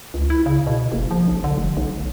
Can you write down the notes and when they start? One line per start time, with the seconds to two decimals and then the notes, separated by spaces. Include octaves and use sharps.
0.14 C#2
0.30 E4
0.46 C#3
0.67 B2
0.92 F#1
1.11 F3
1.28 B1
1.44 D3
1.57 F1
1.77 B1